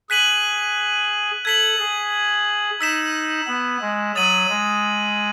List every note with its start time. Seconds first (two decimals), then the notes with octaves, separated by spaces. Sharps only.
0.09 G#4 F#6 B6 D#7 F#7
1.45 A4 G#6 B6 F#7
1.79 G#4
2.80 D#4 E6 B6 E7
3.47 B3
3.81 G#3
4.15 F#3 D#6 A6 D#7 F#7
4.49 G#3